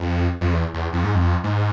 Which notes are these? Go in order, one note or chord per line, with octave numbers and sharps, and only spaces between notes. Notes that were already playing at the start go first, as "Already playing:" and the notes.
Already playing: F2
F2
E2
E2
F2
G#2
F2
G#2